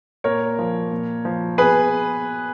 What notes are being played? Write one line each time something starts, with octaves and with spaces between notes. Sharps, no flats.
A#2 A#4 C#5
F3
A#2
F3
B2 G#4 B4